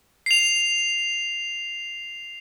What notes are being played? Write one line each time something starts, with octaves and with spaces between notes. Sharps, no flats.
C7 F7